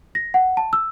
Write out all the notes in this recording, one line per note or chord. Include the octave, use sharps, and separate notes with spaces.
A#6
F#5
A5
E6